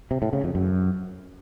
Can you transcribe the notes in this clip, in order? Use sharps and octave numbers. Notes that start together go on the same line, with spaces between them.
C3
A2
C#3
F2
F#2